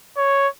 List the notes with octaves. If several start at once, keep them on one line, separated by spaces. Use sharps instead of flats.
C#5